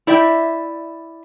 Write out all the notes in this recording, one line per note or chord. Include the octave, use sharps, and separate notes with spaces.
E4 D5 E5 G5